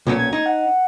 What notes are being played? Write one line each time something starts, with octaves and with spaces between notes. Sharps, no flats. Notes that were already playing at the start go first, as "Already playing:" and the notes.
B1 A#2 C#4
G#6
D#4
F#5